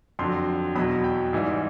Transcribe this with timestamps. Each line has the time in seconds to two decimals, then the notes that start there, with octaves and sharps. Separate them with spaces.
0.19 F2 D3 F#3 C6
0.76 E2 B2 F#3 B5
1.04 G5
1.33 G#2 E3 G3